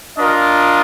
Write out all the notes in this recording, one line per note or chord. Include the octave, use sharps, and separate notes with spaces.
D4 F4 A#4 D#5